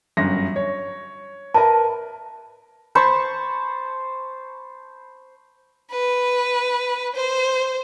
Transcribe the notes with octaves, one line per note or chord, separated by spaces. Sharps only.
G1 F#2 A#6
C#5
A#4 B4 E5 A5
C5 A5 B5 C#6
B4
C5